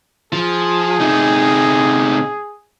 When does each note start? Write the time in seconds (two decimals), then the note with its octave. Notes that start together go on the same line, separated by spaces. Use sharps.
0.32 F3 G#4
1.00 C3 D#4